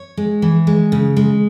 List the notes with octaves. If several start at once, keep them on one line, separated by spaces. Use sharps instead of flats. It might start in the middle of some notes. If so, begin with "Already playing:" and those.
Already playing: C#5
G#3
E3
G#3
C#3
G#3